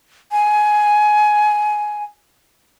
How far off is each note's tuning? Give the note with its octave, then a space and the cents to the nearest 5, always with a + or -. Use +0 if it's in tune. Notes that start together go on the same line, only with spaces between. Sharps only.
G#5 +15